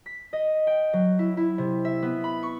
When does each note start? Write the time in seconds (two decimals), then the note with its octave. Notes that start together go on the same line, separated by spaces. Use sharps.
0.06 B6
0.33 D#5
0.67 G5
0.93 F#3
1.19 E4
1.37 E4
1.58 C3
1.85 E5
2.02 B3
2.24 B5
2.43 C#6